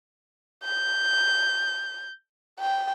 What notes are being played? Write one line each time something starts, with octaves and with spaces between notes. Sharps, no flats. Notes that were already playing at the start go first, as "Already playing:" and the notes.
G6
G5